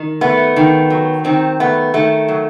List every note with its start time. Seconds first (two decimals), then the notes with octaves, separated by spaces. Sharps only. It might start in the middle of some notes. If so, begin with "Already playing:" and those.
Already playing: D#3
0.21 A3 B3
0.56 D#3
0.90 F#3
1.25 D#3 C4
1.60 A3 B3
1.94 D#3 A3
2.28 F#3